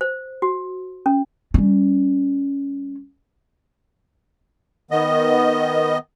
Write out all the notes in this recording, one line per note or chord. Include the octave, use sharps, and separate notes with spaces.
C5
F#4
C#4
G3 C#4
D#3 B3 D#5